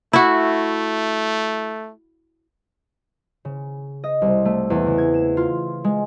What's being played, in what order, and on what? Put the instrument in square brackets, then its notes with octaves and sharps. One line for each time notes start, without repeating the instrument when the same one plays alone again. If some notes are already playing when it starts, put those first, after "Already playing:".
[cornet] A3 [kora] E4 F#4
[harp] C#3
D#5
C2
A3
E2
C#3
G#6
E7
F4
G#3